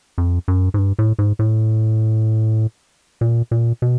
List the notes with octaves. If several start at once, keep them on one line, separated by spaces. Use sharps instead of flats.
F2
F#2
G#2
G2
A2
G#2
A2
A#2
A#2
B2